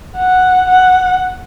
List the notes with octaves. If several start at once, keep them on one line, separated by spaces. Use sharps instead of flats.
F#5
F#5